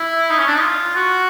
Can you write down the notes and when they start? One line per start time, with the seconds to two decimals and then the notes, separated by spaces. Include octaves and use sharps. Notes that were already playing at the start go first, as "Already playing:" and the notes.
Already playing: E4
0.30 D#4
0.39 C#4
0.47 D4
0.55 D#4
0.63 F4
0.95 F#4